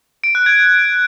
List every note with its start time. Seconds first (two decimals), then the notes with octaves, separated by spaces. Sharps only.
0.24 D7
0.35 F#6
0.46 G#6